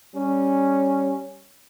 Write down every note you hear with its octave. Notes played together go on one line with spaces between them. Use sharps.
G3 C#4